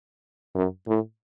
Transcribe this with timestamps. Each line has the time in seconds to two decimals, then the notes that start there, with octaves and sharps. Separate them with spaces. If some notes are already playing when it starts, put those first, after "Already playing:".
0.55 F#2
0.88 A2